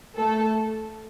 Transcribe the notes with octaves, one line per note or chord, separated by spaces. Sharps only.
A3 A4